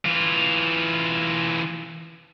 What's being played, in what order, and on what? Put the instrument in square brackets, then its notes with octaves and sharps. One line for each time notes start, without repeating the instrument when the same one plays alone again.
[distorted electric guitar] E3 F4